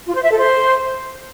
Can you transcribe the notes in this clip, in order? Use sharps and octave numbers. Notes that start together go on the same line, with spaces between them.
F4
C5
E5
A4
C5